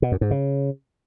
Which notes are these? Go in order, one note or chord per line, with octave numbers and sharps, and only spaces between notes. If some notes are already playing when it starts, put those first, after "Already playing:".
B2
F#2
G#2
C#3